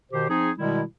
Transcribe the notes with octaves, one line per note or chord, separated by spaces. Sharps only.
B2 D#3 G4 C5
F3 C4 D#4 G#4
B2 D#3 G3 G#3 E4